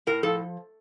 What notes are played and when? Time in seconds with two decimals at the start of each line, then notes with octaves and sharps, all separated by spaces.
0.07 A2 A#4
0.23 F3 A4